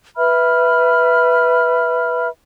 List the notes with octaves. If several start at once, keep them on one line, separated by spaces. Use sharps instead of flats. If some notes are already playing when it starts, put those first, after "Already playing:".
B4 E5 B5 F6